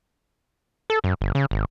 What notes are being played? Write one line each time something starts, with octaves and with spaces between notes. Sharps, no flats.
A4
F#2
G1
C#3
G#1